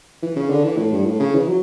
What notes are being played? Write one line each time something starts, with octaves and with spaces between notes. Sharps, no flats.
E3
C#3
D3
E3
A2
G2
A2
C#3
E3
F#3